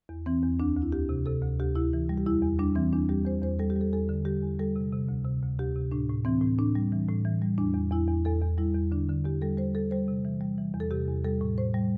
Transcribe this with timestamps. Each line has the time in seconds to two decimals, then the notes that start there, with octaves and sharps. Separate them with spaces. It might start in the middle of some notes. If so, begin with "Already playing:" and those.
0.09 E2
0.26 E3 C4
0.43 E2
0.60 D2 D4
0.76 D2
0.82 E4
0.92 D2 G4
1.09 C3
1.26 C3 A4
1.42 D2
1.60 D2 G4
1.76 D2 E4
1.93 E3
2.09 G3
2.18 G4
2.26 E2 E4
2.42 E2
2.59 G3 D4
2.75 E3 C4
2.93 E2 D4
3.09 G3 G4
3.25 E2 C5
3.42 E2 C5
3.59 G3 A4
3.70 G4
3.76 G3
3.81 A4
3.92 E2 A4
4.09 D3
4.25 G3 G4
4.43 E2
4.59 G3 A4
4.76 C3
4.93 C3
5.08 D2
5.25 C3
5.43 D2
5.59 D2 G4
5.76 C3
5.92 A2 D4
6.09 A2
6.25 E3 C4
6.41 A2
6.58 A2 D4
6.75 G3
6.92 E3
7.09 A2
7.25 E3
7.42 G3
7.58 E2 D4
7.75 E2
7.92 E2 E4
8.08 E2
8.25 E2 A4
8.42 E2
8.58 G3 E4
8.75 E2
8.92 D3 D4
9.09 D3
9.24 E2 G4
9.42 G3 A4
9.58 G3 C5
9.75 G3 A4
9.91 G3 C5
10.08 C3
10.25 E3
10.41 G3
10.58 E3
10.74 E2
10.80 A4
10.91 C3 G4
11.08 E2
11.24 G3 A4
11.41 A2
11.58 A2 C5
11.74 G3